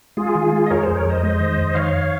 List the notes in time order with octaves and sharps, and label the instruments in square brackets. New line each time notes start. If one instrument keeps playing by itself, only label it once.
[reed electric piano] G#3 [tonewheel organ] F4 G#4
[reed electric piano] D#3
G#3
[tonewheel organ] D#5
[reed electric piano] F2 [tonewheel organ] A#4 C#5
[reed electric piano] F2 [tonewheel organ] G#4 C5
[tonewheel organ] A#4 C#5
[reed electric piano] F2 [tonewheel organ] C5 D#5
[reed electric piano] G#3
D#3
F2
[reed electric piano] D#3 [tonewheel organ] C#5 F5
[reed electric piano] F2